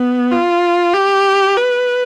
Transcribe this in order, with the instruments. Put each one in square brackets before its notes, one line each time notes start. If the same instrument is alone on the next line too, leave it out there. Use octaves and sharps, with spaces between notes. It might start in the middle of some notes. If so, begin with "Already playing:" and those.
Already playing: [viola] B3
F4
G4
B4